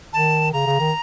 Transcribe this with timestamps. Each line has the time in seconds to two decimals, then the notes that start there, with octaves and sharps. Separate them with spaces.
0.13 D#3 A5
0.53 C#3 A#5
0.67 C#3
0.80 D#3